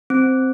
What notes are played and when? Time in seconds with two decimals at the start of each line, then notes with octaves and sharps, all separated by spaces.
0.10 C4